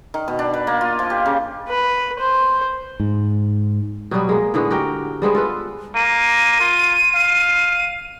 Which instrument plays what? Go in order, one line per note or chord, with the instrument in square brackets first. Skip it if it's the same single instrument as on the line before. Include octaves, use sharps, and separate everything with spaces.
[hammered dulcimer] D#3
B2
D4
B4
A#3
F4
F3
G4
C#3
[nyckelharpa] B4
C5
[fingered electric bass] G#2
[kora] B2 F#3 G3 B3
G#3 A#3
A2 D3 G#3 B3
F#4 G4 A#4 G5
G3 G#3 B3 C5
F4 A4 B4
[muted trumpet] A#3 [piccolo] D#7
[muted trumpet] F4
F5